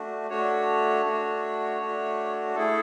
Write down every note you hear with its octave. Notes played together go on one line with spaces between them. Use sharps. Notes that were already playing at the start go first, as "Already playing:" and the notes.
Already playing: A3 D4 F#4
A3 D4 F#4 C#5
A3 D4 F#4
A3 D4 F#4
A3 E4 G#4 A4